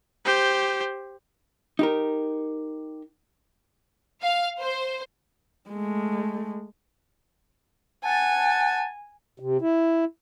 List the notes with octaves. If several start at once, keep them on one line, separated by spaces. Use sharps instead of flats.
G4 C5
D#4 G4 A#4
F5
C5
G#3 A3
F#5 G#5 A5
C3
E4